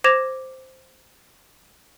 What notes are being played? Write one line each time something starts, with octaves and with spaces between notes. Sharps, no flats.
C5 D6 G#6 A#6 E7 F7